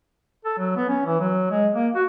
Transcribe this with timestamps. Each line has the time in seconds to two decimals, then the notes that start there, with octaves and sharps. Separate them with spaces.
0.45 A4
0.58 F#3
0.76 B3
0.88 C#4
1.06 E3
1.20 F#3
1.50 G#3
1.74 A#3
1.95 F#4